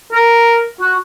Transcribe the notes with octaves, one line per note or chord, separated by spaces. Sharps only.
A#4
F#4